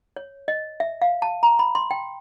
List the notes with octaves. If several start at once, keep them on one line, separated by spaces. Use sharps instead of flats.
C#5
D#5
E5
F5
A5
A#5
B5
C6
G5